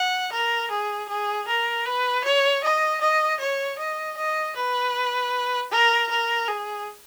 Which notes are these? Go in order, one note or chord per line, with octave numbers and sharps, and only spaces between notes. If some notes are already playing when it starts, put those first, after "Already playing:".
Already playing: F#5
A#4
G#4
G#4
A#4
B4
C#5
D#5
D#5
C#5
D#5
D#5
B4
A#4
A#4
G#4